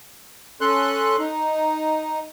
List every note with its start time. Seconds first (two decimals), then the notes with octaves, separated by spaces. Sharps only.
0.61 C#4 A4 C6 F#6
1.19 D#4